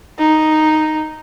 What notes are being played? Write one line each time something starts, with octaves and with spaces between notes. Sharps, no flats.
D#4